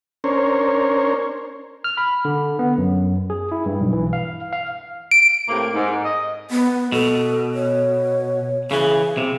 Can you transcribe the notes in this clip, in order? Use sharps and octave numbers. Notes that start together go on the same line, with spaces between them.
C#4 D4 A#4 C5 C#5
F6
B5
D3
B3
F#2
G#4
E4
G2
B1
E3
F5
F5
D7
A2 C3 A#3
G#2
D#5
B3
B2 A4
C#5
C#3 E3 G#4
C3